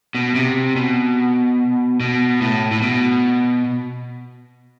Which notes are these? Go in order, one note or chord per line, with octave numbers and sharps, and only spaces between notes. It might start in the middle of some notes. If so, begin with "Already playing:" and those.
B2
C3
B2
B2
A2
A2
B2